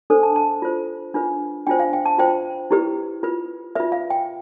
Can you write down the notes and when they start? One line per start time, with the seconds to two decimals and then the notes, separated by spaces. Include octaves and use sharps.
0.10 D4 A4 C5
0.23 A5
0.36 A5
0.62 F4 C5
1.14 D4 F4 B4
1.67 D4 F4 C5 G5
1.80 F5
1.93 G5
2.06 A5
2.18 F4 C5 G5
2.71 E4 G4 B4
3.23 F4 B4
3.75 F4 B4 E5
3.92 F5
4.10 G5